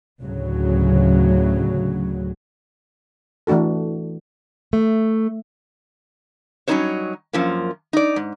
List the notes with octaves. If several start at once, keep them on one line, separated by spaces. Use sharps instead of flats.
D2 A2 C#3 F#3
E3 A3 D4 F#4 A4
A3
F#3 G3 C#4 D#4 C5 C#5
F#2 F3 A#3
D#4 D5
G#2